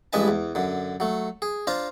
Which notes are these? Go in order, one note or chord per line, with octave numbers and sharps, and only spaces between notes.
A1 G2 G#3 B4 G#5 A5
E2
F#2 D3
F#3 A3
G#4
D4 F4 C5 A#5